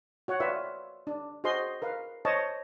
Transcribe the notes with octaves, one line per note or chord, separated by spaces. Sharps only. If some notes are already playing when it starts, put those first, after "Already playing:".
F#4 C#5 F#5
F4 B4 D5 E5
D4
F#4 G#4 C5 D#5 C6
A#4 B4 F5
C5 C#5 D#5 A5